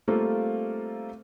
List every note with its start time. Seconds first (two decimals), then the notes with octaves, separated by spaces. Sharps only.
0.08 G3 A3 A#3 C4 F4 A4